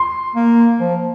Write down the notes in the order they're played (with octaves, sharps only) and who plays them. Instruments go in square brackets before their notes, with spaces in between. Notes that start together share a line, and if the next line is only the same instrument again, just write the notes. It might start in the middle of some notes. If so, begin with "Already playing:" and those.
Already playing: [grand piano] C6
[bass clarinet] A#3
F3